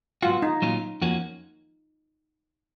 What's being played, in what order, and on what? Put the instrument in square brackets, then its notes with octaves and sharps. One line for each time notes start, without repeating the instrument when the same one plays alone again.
[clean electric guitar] G#2 F#3 B3 F#4 [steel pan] F4
[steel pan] D#4
[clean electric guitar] A#2 F#3 C#4 F4
F2 F3 A#3 C#4 F#4